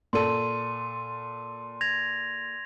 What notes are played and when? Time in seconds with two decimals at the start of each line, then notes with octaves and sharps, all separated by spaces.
0.13 A#2 A4 C6 D#7
1.81 G#6 A#6 F7